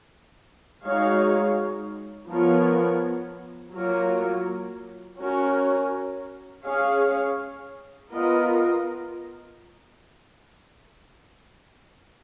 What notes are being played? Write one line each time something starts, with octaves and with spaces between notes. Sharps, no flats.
G#3 D#4 F#4 C#5 F5
F3 B3 F4 A#4 C#5
F#3 A#3 F4 A#4 C#5
C#4 F#4 A#4 C#5
C#4 G#4 C#5 F5
B3 F4 A#4 D#5